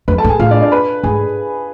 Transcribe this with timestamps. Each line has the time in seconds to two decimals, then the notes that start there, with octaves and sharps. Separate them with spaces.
0.08 F2 B4 B5
0.18 A4 A5
0.24 G#2
0.29 G#4 G#5
0.39 A2 F4 F5
0.50 D4 D5
0.62 D4 D5
0.72 B4 B5
1.03 G#2 G#4 G#5